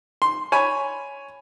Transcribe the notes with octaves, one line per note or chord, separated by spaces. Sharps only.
C6
C#5 G#5 B5